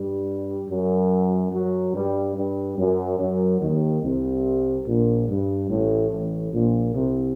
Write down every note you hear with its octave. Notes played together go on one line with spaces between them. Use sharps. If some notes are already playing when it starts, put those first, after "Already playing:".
Already playing: G2 G3
F#2 F#3
F#2 F#3
G2 G3
G2 G3
F#2 F#3
F#2 F#3
D#2 D#3
C2 C3
A#1 A#2
G2
A1 A2
A1 A2
A#1 A#2
C2 C3